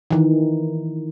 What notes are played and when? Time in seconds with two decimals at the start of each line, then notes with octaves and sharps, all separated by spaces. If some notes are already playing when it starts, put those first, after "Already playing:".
0.11 D#3 E3